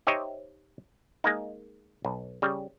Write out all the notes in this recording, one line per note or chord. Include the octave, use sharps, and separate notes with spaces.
D#4 G4 C5 C#5 D#5 E5
G#3 A#3 D#4
B1
C#3 G3